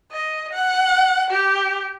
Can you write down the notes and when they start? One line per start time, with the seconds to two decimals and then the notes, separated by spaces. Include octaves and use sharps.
0.12 D#5
0.53 F#5
1.30 G4